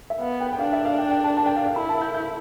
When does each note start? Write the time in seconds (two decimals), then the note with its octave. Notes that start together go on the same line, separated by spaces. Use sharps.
0.10 E5
0.20 B3 F5
0.40 G5
0.53 G5
0.59 D4 F5
0.73 E5
0.85 F5
0.98 G5
1.11 G5
1.24 A5
1.37 A5
1.46 G5
1.56 F5
1.67 F5
1.75 E4 B5
1.89 A5
2.01 G6
2.14 G6